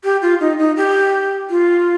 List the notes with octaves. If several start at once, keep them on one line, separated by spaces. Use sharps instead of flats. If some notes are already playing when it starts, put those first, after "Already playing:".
G4
F4
D#4
D#4
G4
F4